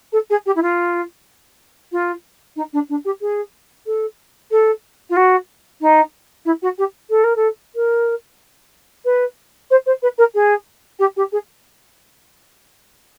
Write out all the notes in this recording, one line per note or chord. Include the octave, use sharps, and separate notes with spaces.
A4
G#4
G4
E4
F4
F4
D#4
D4
D4
G4
G#4
A4
A4
F4
F#4
D#4
E4
F#4
G4
A4
A#4
A4
A#4
B4
C5
C5
B4
A#4
G#4
G4
G4
G#4